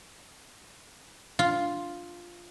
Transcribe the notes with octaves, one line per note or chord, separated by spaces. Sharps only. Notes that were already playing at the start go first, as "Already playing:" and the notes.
F4